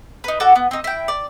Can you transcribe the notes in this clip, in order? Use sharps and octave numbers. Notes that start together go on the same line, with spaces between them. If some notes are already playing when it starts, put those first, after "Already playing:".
D#4 B4
F#4 A4 D5
B3
C4 D#4
E4 G5
D5